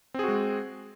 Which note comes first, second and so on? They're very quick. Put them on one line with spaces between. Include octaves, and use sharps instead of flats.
C4 G#4 F#4 G#3